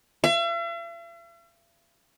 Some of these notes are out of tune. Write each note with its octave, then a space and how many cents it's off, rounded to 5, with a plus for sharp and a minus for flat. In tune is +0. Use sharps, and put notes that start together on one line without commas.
E5 +45